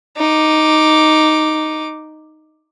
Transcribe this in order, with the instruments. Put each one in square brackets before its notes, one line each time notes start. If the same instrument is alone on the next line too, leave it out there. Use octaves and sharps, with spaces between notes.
[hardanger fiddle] D#4 D6